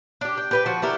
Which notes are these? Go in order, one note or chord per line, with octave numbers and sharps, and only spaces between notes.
D4 G4
G5
G4 B4 G5
F3 F#4
D4 E4 G4 A#4